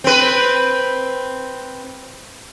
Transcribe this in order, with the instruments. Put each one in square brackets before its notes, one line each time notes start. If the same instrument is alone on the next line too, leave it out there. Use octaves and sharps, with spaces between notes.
[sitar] C4 B4